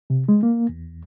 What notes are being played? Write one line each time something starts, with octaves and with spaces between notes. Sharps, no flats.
C3
G#3
A#3
E2